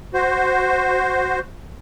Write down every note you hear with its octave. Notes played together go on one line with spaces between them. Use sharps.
F#4 C5